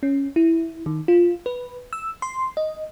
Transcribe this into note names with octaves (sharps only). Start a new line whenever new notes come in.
C#4
E4
D#3
F4
B4
E6
C6
D#5